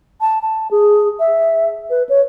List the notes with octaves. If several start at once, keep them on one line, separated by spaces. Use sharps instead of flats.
A5
A5
G#4
E5
B4
C#5